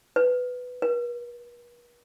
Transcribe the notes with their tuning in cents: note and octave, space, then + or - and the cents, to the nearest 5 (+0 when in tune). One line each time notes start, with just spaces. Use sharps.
B4 +10
B4 -45